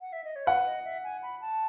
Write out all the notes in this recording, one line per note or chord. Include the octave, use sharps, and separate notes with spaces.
F#5
E5
D#5
C#5
B4 F#5
D#5
E5
G#5
B5
A5